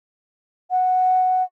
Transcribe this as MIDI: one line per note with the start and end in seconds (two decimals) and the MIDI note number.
0.71 1.43 78